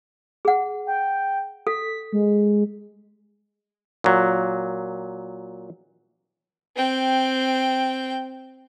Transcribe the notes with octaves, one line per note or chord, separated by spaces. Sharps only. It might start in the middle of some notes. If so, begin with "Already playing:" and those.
G#4 F#5
G5
A4 B6
G#3
A#2 F#3
C4 G5